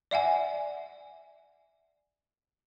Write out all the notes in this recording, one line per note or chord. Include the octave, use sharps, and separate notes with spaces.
D5 E5 F#5 G#5